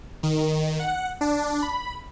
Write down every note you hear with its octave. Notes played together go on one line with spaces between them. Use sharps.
D#3
F#5
D4
B5